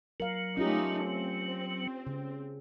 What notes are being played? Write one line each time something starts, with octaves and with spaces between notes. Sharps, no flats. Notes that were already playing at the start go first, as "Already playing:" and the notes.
F#3 A#4 F5
A3 C#4 D#4 F4 G4
C4
C#3